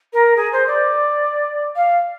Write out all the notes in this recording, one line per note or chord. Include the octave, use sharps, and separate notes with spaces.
A#4
G#4
C5
D5
F5